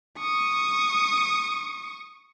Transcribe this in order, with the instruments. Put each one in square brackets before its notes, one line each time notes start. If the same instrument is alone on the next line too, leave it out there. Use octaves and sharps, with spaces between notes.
[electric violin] C#6 D#6